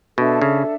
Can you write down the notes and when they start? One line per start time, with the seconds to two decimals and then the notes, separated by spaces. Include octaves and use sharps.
0.18 B2 D4 A4 E5
0.42 C#3